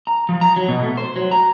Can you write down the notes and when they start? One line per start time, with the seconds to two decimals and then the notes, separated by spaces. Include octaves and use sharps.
0.07 A#5
0.29 F3
0.41 A#5
0.56 F#3
0.68 B2
0.82 A3
0.97 C5
1.16 F#3
1.31 A#5